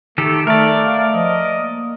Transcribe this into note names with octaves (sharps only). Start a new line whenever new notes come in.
D#3 A3 G4 A4
A3 A4 A#4 D5
F5
F3 D#5
A#3